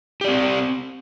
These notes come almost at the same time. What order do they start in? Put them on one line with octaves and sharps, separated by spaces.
G4 D5 C4